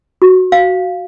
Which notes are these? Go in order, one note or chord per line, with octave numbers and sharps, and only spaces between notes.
F#4
F5